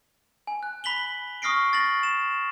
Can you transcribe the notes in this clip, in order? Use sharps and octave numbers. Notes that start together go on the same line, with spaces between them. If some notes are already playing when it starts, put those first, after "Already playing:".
G#5
F#6
B5 B6 F#7 G7
C#6 D#6 F6 A#6 C7 D7
A6 A#6 F#7
E7